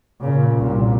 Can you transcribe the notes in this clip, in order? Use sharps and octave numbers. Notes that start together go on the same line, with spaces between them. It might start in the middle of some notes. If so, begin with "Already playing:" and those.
A#2 C#3
C2 A#2